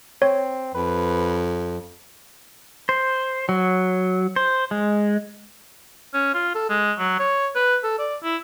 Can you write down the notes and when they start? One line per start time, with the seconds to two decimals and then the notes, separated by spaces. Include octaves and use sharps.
0.22 C4 C#5
0.75 F2 B4
2.89 C5
3.49 F#3
4.36 C5
4.71 G#3
6.14 C#4
6.34 F4
6.55 A4
6.70 G#3
6.99 F#3
7.20 C#5
7.56 B4
7.84 A4
7.99 D5
8.23 E4